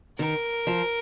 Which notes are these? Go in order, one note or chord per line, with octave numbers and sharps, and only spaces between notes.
D#3 A#4
F3